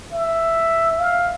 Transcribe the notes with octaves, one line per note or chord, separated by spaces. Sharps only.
E5
F5